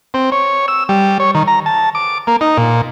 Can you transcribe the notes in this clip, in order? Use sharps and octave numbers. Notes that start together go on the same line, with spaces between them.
C4
C#5
E6
G3
C#5
D#3
A#5
A5
D6
A#3
D#4
A#2